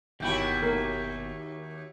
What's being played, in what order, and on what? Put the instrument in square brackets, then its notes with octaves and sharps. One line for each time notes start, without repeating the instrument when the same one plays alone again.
[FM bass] G1 [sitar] D#2 E4 F#4 [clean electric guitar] B2 G4 B5
[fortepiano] A#3